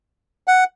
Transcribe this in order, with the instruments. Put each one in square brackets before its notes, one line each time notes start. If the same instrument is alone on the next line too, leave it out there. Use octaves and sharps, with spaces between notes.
[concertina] F#5